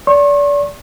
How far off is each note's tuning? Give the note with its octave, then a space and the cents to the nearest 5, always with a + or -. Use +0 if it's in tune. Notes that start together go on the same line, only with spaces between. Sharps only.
D5 -30 C#6 -45